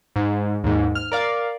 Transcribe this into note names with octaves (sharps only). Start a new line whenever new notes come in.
G#2
D#2 G#2
F6
A#4 D5 F5